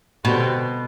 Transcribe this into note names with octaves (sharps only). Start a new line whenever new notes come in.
B2 D3 G3 C4 F#4